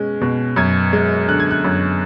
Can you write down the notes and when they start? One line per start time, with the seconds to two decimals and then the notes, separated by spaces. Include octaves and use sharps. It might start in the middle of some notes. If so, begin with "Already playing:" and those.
Already playing: B2 G#3 C#4
0.21 B2
0.56 F#2 G#6
0.93 G#3
1.28 D3 F#6
1.40 G#6
1.51 F#6
1.64 F#2